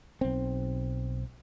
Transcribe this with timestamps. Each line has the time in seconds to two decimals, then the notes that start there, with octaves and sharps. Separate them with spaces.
0.21 B1 C4